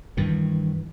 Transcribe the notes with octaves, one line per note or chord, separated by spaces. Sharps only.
G2 D#3 E3